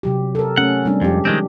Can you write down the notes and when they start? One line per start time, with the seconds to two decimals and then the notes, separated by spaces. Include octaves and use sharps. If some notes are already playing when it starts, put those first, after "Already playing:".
0.03 C3 F#3 G4
0.35 A4 A#4
0.57 A3 C#4 F#5
0.85 G3 C4 D4
1.02 F2 G#3 G4
1.25 D#3 F3 G#3 C4